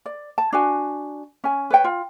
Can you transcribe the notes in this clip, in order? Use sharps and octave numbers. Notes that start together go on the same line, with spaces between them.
D5
A5
D4 F#4 G#5
C#4 G#5
B4 C#5 G5
F4